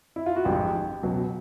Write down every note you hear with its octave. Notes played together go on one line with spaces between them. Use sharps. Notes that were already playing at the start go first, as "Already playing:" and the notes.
E4
F4
F#4
A1 G#2 F3 G4
C#2 B2 F#3